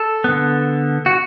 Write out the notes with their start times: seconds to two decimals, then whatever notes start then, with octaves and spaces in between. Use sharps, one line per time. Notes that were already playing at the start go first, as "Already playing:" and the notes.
Already playing: A4
0.24 D3 B3
1.06 F#4